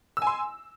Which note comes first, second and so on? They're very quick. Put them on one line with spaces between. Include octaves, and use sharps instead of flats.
E6 G#5 C6